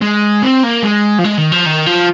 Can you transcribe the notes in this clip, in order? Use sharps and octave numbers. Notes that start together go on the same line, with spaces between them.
G#3
C4
A#3
G#3
F3
G#3
D#3
F3
D#3
F3